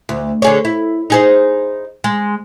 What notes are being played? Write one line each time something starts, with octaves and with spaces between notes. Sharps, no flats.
D2
D3 G#4 C#5
E4
D#4 G#4 C5
G#3